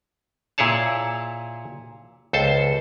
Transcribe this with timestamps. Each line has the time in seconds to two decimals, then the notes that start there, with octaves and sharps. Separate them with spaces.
0.58 A#2 E4 G#4 C#5 A5
2.33 C#2 A4 C5 A5